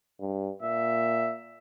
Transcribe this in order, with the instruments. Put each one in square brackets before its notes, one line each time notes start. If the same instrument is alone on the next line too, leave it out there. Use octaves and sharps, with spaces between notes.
[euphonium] G2
[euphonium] A#2 [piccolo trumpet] E5